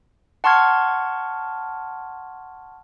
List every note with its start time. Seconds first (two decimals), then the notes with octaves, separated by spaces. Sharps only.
0.44 F#5 A5 C6 C#6 F6 G#6